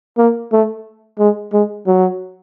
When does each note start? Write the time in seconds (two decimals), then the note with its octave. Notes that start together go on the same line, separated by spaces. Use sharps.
0.18 A#3
0.52 A3
1.19 G#3
1.53 G#3
1.86 F#3